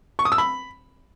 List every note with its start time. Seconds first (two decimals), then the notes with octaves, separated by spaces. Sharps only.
0.19 C#6
0.25 D#6
0.32 E6
0.38 B5